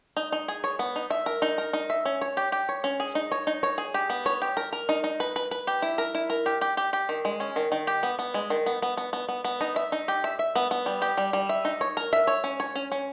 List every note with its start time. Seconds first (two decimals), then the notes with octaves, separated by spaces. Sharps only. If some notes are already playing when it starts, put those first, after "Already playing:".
0.17 D#4
0.32 D#4
0.48 G#4
0.64 C#5
0.79 B3
0.96 D#4
1.10 E5
1.26 A#4
1.42 D#4
1.58 A#4
1.73 D#4
1.90 E5
2.05 C#4
2.21 C#5
2.37 G4
2.52 G4
2.69 C#5
2.84 C#4
3.00 G#4
3.15 D#4
3.31 C#5
3.47 D#4
3.63 C#5
3.78 G#4
3.94 G4
4.10 B3
4.26 C#5
4.42 G4
4.57 A#4
4.73 A#4
4.89 D#4
5.04 D#4
5.20 B4
5.36 B4
5.51 B4
5.67 G4
5.82 E4
5.98 A#4
6.15 E4
6.30 A#4
6.46 G4
6.61 G4
6.77 G4
6.93 G4
7.09 D#3
7.25 G#3
7.40 C#4
7.56 D#3
7.72 D#3
7.87 G4
8.03 B3
8.19 B3
8.34 G#3
8.50 D#3
8.66 B3
8.82 B3
8.97 B3
9.13 B3
9.28 B3
9.45 B3
9.61 D#4
9.76 E5
9.92 D#4
10.08 G4
10.24 E5
10.39 E5
10.55 B3
10.71 B3
10.86 G3
11.02 G4
11.17 G3
11.33 G3
11.49 E5
11.65 D#4
11.81 C#5
11.97 A#4
12.13 E5
12.27 C#5
12.44 C#4
12.60 C#5
12.75 C#4
12.92 C#4